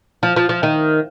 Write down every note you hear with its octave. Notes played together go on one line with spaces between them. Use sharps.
F3
F3
F3
D#3